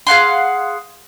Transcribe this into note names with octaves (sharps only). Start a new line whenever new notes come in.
G#4 F5 F#5 C6